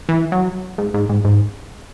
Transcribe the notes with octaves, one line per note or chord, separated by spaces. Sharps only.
E3
F#3
G#2
G#2
G#2
G#2